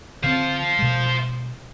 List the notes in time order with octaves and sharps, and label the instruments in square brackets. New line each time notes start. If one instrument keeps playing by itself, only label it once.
[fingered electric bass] D3 C4 [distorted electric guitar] C5 F5
[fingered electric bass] B2 G#3